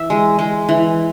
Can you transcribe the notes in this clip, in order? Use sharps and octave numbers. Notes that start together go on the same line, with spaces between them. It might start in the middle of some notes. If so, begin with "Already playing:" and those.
Already playing: E3 E5
G#3
G#3
E3